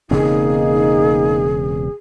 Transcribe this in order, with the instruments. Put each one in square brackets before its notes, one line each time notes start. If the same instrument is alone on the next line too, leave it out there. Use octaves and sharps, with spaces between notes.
[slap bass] E1 C#3 C4 [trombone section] A#3 D#4 [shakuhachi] G#4